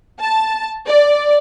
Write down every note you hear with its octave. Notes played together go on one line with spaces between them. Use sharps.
A5
D5